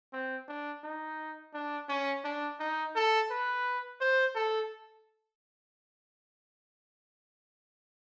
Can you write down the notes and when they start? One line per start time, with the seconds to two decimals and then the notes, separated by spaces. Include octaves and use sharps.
0.13 C4
0.48 D4
0.84 D#4
1.54 D4
1.89 C#4
2.24 D4
2.60 D#4
2.95 A4
3.30 B4
4.01 C5
4.35 A4